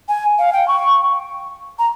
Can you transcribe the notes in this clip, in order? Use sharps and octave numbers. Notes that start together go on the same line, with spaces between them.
G#5
F5
G5
C#6
A#5